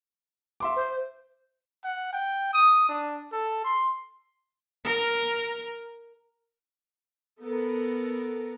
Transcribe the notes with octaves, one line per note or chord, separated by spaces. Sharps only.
E5 C6 D6
C5
F#5
G5
D#6
D4
A4
C6
A#4
B3 A4 A#4